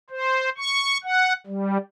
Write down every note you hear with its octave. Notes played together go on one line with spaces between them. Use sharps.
C5
C#6
F#5
G3